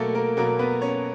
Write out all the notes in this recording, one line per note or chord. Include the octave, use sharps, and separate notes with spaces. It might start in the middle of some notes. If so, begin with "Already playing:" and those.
Already playing: B2 F#3 A3 A#3 A4 A#4
A#3 A#4
B2 F#3 A#3 A#4
B3 B4
C#4 C#5